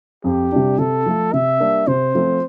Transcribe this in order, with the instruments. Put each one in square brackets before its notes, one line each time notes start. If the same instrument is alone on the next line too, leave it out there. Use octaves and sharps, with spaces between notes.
[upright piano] F2 [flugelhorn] G4
[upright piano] C3 G3 D4
[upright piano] C3 [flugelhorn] A4
[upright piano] F3 A3
[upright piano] C3 [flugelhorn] E5
[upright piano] G3 A#3 D4
[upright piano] C3 [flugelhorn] C5
[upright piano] F3 A3 C4